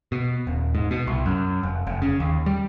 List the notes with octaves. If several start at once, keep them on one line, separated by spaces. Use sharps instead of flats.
B2
D#1
G#2
B2
C2
F#2
F1
F1
C#3
D#2
G3